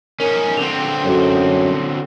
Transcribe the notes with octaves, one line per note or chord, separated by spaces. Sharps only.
C#4 D#4 A#4
D3 C4 F7
F#2 F#4 A4 C#5